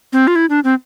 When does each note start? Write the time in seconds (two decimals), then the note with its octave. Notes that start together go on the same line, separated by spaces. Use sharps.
0.13 C4
0.27 F4
0.36 E4
0.50 D4
0.64 C4